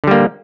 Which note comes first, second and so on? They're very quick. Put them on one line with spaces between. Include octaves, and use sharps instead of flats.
D3 G3 A#3